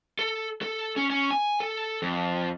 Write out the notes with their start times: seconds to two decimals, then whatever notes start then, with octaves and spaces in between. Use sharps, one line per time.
0.19 A4
0.62 A4
0.96 C#4
1.10 C#4
1.31 G#5
1.60 A4
2.02 F2